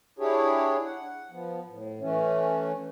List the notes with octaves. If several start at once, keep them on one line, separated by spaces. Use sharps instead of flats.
D4 E4 G4 G#4 C#5
F#5
F3 B3
A2
E3 A3 C#4